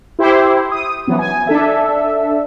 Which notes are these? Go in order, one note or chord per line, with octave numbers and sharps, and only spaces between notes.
E4 G4 C5
D#6
E3 F#3 B3
G#5
D4 A4 E5